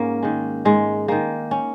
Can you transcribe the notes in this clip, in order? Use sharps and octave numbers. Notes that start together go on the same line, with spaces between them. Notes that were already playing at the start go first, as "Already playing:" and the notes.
Already playing: G#2 A#3 C#4
D#3 G#3
G#2 G#3
D#3 G#3 A#3
C#4